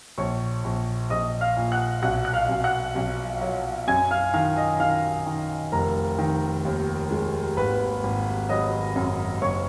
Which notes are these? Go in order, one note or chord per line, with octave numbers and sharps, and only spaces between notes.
A#1 C#5 C#6
A#1
A#1 D#5 D#6
F5 F6
A#2
F#5 F#6
B1 F#5 F#6
F#6
F5 F6
B1
F#5 F#6
B1
F#3
F#2 G#5 G#6
F5 F6
D#3 F5 F6
D#5 D#6
D#3 F5 F6
D#3
F1 A#4 A#5
D#3
D#2
G#3
G#1 B4 B5
G#1
F#3 D#5 D#6
F#2
F#1 C#5 C#6